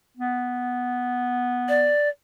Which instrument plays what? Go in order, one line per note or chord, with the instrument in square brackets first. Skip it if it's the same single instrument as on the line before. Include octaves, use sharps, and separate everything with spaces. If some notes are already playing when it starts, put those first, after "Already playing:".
[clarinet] B3
[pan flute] D5